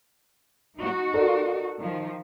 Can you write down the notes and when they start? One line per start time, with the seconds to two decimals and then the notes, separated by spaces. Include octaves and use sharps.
0.79 D#4 F#4
1.14 A4 A#4 D5
1.81 D#3 F3